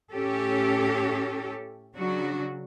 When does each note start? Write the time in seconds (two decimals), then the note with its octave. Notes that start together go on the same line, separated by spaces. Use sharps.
0.11 A2 C#4 G4 A4
1.95 C#3 F#3 D4 F#4